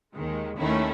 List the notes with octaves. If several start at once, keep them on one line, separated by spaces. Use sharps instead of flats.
D#2 D#3 G#3
D#2 D#3 A3 C#4 E4